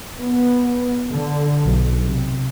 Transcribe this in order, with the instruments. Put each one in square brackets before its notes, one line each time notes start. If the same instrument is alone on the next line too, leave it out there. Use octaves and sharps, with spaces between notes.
[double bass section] B3
D3
B1
C3